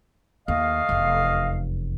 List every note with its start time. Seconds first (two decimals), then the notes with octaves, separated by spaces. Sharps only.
0.48 D#2 A3 D#5 F5
0.89 F1 E2